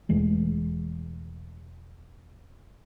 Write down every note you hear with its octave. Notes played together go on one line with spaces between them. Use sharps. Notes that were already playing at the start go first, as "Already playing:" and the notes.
E1 E3 G#3 A3